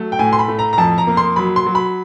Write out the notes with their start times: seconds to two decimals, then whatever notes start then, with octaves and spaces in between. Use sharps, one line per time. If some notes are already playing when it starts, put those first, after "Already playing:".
Already playing: F#3 A3
0.12 G5
0.19 A2 G#5
0.33 C6
0.39 B5
0.48 A3
0.59 A#5
0.73 A#5
0.78 F2 A5
0.98 A#5
1.07 A#3
1.17 C6
1.36 F#3 B5
1.56 C6
1.66 F#3
1.75 B5